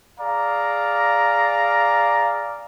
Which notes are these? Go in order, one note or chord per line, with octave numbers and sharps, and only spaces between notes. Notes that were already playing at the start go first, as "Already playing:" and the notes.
G#4 D5 F5 A#5